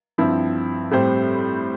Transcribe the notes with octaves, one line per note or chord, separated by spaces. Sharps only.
G2 F3 C4 E4
A2 G3 C4 G4 C5